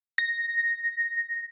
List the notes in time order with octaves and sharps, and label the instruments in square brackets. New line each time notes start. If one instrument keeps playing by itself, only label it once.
[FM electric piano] A#6